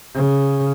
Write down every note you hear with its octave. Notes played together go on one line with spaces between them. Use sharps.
C#3